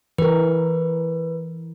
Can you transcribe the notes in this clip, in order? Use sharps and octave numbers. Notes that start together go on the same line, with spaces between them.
E3 A#4 B4